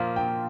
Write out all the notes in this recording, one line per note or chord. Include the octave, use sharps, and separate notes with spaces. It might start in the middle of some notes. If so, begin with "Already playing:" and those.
Already playing: A#2 F3 A#3 F5
G5